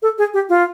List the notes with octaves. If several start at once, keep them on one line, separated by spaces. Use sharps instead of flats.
A4
G#4
G4
F4